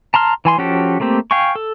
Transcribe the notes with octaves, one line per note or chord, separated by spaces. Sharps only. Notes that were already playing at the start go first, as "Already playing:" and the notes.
A5 A#5 C6 F6
E3 G#5 C6
F3 C#4 F#4 G4 A4
A3 A#3 C4 G4
F5 G5 G#5 C#6
A4